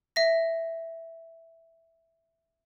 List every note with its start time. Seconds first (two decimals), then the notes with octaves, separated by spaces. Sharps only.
0.16 E5 A#6